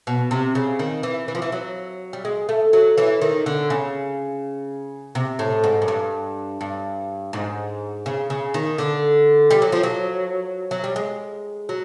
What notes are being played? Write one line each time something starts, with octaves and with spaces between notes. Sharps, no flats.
B2
C3
C#3
D#3
E3
E3
F3
E3
F#3
G3
G#3
A3
F#3
E3
D#3
D3
C#3
C3
A2
G#2
F#2
G2
G2
G#2
C#3
C#3
D#3
D3
G3
F#3
F3
F#3
F#3
G3
G#3
F#3